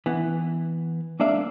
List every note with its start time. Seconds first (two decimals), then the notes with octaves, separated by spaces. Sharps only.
0.06 E3 B3
1.20 G#3 A#3 D4 D5 E5 F5